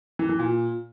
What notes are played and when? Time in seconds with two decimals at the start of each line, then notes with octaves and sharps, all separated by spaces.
0.19 E3
0.29 E3
0.39 A#2